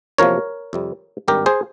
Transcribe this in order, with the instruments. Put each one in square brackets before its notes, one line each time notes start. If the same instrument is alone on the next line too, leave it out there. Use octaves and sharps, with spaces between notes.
[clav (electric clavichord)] E2 C3 F3 A#3 A#4 C#5
F2 C3 G3
G#1 G2 G3 G4 A#4
G#4 C5